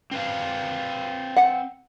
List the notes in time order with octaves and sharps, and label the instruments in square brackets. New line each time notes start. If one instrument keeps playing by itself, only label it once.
[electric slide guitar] C4 B4 F5
[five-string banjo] F#5